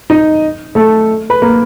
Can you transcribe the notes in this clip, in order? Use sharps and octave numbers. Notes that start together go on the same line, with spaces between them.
D#4 D#5
A3 A4
B4
A#3 A#4